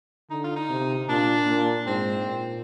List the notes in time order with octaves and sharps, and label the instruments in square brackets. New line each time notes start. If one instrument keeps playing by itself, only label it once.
[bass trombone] D3 [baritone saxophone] D#4
[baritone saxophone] F4
D#4
[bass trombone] C3
[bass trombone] A#2 [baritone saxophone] D4
[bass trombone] A#2
[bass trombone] G#2 [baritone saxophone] C4
[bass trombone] A#2